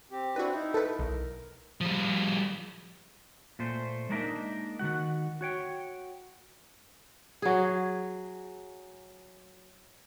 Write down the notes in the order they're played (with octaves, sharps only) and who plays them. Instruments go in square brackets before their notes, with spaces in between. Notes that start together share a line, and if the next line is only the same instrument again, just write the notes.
[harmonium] C4 G4
[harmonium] C4 D4 E4 [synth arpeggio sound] F#4 B4
[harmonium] D#4 E4
[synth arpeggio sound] A4 B4
[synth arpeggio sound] B1 [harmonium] A#4
[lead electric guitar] F3 G3
[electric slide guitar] A#2 A3 C5
G#3 A#3 D4 D#4 A#4 E5
D#3 F3 F#4 F#5
F#4 C#5 G5
[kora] F#3 G#4